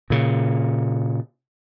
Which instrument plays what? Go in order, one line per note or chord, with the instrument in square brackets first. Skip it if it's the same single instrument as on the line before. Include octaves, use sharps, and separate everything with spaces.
[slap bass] A#2 C#3